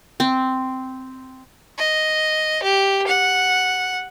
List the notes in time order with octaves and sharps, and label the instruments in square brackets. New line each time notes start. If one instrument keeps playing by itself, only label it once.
[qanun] C4
[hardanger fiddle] D#5
G4
F#5